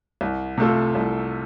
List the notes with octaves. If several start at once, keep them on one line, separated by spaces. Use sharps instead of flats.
C2
C3 A3 F4 A4
C2